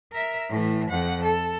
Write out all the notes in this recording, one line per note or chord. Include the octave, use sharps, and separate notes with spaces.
A#4 E5
A2 E3
F2 F#5
A4